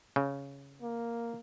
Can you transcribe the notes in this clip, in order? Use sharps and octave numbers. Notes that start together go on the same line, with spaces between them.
C#3
A#3